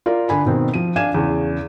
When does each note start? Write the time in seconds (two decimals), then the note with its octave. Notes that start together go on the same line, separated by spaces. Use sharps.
0.06 F4 A#4 D5 F5
0.29 D3 G#5 B5
0.46 B2 D#3 C4
0.74 F3 D#7
0.96 D4 F5 G#5 G#6 D#7 E7
1.15 E2 C#3